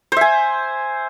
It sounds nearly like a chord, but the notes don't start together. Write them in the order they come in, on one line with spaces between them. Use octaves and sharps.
C5 E5 G#5